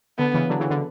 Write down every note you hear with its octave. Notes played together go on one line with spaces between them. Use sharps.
D3 B3
C#3 E3
D3 F#3
C#3 E3
D3